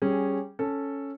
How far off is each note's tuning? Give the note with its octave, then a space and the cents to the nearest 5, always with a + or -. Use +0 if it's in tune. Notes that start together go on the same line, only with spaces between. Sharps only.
G3 -10 C#4 -10 G#4 +0
C#4 +0 A4 +0